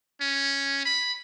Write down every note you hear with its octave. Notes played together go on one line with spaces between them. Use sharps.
C#4
B5